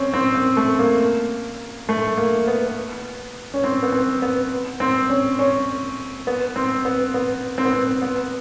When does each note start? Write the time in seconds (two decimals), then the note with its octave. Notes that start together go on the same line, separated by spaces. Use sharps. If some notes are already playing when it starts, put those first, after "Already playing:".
Already playing: C4 C#4
0.14 C4
0.35 C4
0.57 A3
0.79 A#3
1.89 A3
2.17 A#3
2.48 B3
3.54 C#4
3.64 C4
3.83 B3
3.92 C4
4.22 B3
4.80 C4
5.09 C#4
5.39 C#4
6.27 B3
6.56 C4
6.85 B3
7.14 B3
7.58 C4
7.65 B3
7.73 C4
8.02 B3